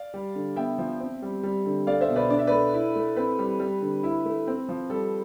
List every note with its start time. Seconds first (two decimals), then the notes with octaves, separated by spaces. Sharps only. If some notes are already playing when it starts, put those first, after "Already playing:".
Already playing: D5 F5
0.14 G3
0.35 D3
0.56 B3 E5 G5
0.78 F3
1.00 C4
1.22 G3
1.43 G3
1.66 D3
1.87 A3 D5 F5
2.01 C5 E5
2.09 B2
2.16 B4 D5
2.30 D4 D5
2.39 E5
2.47 A3 B4 D5
2.74 E4
2.96 A3
3.16 C4 B4
3.38 G3
3.60 G3
3.82 D3
4.03 E4
4.26 A3
4.47 C4
4.69 F3
4.90 G3 A4